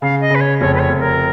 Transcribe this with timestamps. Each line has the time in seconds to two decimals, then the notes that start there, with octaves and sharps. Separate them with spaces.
0.02 C#3 F5
0.21 D#5
0.30 C#3 B4
0.41 C#5
0.60 F1 C#5
0.75 B4
0.79 C#5
0.89 F1
0.99 A#4